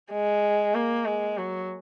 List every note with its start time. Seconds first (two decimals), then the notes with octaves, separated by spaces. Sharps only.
0.12 G#3
0.74 A#3
1.06 G#3
1.38 F#3